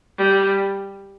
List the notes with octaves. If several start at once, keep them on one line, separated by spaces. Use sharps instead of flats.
G3